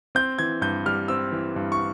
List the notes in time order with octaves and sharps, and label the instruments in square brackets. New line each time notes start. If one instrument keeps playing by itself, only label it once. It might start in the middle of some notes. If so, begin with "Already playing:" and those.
[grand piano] C4 G6
E3 G#6
G2 G6
G3 F6
C4 E6
E3
G2
C#6